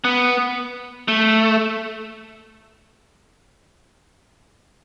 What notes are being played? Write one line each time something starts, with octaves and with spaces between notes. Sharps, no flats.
B3
A3